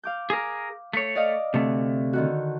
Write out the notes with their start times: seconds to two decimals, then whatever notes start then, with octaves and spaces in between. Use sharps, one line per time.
0.04 F5 D6 G6
0.30 G#4 A#4
0.93 A3 C#5
1.16 D5 D#5 F5
1.54 D2 C3 A3
2.13 D3 D#3 F#4